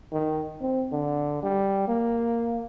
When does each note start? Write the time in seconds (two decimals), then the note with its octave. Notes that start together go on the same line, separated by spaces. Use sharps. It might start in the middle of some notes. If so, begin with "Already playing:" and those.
0.12 D#3
0.61 C4
0.92 D3
1.42 G3
1.88 A#3